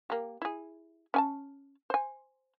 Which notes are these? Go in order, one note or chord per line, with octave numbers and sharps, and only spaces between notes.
A#3 G4
E4 G#4
C#4 G#5 A5
C5 G#5